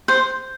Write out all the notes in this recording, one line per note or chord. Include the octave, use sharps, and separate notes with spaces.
C5